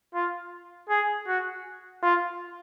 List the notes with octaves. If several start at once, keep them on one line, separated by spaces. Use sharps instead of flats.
F4
G#4
F#4
F4